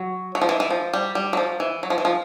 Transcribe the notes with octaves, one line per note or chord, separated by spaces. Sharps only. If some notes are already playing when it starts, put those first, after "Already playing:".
Already playing: F#3
F#3
F3
E3
E3
F3
G3
G3
F#3
F3
E3
F#3
F3
E3
F3